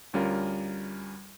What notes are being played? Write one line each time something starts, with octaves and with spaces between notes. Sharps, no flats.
D2 G3 C#4 F4 A#4